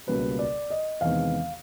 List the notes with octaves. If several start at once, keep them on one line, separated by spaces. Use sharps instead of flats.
C#2 B2 G3 A#3 C#4 B4
D5
D#5
E2 C3 D#3 G#3 B3 F5